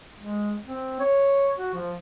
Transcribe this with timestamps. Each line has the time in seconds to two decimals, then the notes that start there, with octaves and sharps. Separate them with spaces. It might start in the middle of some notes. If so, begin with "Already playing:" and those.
0.18 G#3
0.67 C4
1.00 C#5
1.58 F#4
1.74 F3